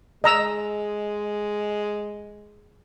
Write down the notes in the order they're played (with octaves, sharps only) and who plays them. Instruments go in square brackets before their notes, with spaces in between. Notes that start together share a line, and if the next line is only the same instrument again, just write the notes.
[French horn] G#3 [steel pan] D#5 A#5 E6